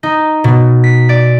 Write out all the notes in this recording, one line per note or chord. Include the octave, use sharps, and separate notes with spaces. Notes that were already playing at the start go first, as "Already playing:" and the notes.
D#4
B2
B6
D5